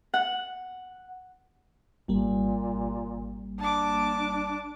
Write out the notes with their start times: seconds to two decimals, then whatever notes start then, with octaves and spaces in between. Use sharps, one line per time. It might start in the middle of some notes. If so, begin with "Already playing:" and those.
0.14 F#5
2.08 G#1 A#2 G3 A#3
3.59 D4 A5 D6